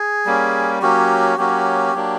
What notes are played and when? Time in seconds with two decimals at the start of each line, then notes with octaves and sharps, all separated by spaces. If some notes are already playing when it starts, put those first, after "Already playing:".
Already playing: G#4
0.26 G3 A#3 C#4
0.82 F#3 A#3 C#4 F#4 G4
1.38 F#3 A#3 C#4 F#4 G4
1.94 F#3 A#3 D4